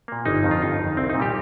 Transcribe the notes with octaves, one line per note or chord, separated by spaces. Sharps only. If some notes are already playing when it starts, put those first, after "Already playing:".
A#2 A#3
G1 D#4
F2 D#3
F4
G1 D#4
F2 D#3
C2 C4
D#4
A#2
G3 G4